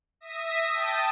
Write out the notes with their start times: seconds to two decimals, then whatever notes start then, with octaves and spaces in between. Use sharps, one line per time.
0.20 E5 D#6 A#6 B6
0.72 G5 A5 D#6